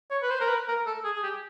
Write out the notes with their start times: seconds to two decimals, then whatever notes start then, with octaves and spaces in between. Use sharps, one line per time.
0.11 C#5
0.22 B4
0.30 C5
0.40 A#4
0.48 B4
0.68 A#4
0.87 A4
1.04 G#4
1.16 G#4
1.23 G4